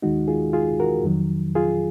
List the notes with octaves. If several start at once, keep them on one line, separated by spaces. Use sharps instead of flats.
D#2 D#3 G#3 D#4 F#4
F4 G#4
F4 G#4
F#4 A#4
F2 D#3 F#3
F4 G#4